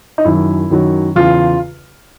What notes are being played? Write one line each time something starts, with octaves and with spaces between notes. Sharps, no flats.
D#4
F#2 D#3 F#3 E4
F#2 D#3 F#3
E2 C#3 E3 F4